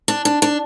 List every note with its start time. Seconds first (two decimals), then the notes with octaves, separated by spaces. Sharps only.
0.08 D4
0.25 D4
0.42 D4